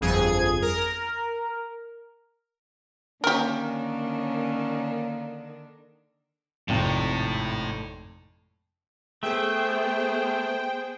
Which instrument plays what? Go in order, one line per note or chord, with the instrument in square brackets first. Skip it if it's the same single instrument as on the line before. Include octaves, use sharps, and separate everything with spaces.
[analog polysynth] G1 F2 G#4 G#6
A#4
[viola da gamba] D3 D#3 D4 [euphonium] A#3 [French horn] C#4 [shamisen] G4 A#4
[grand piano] G#1 F2 C3 [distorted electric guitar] A2
[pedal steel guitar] A3 [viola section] B3 G#4 C5 [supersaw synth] G5